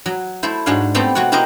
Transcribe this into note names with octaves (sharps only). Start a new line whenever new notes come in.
F#3
A3 E4 C5
G#2 D4 F#4 C#5 F5
A3 B3 C4 G4 A4 C#5
B2 C4 F#4 C#5 F#5
E4 F#4 G4 A#4 C5 D#5